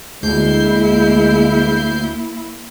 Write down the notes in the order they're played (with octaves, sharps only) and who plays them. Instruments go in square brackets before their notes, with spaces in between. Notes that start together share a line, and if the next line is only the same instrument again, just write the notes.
[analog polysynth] D2 G6 C7 [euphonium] G#3 [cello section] A#3 E4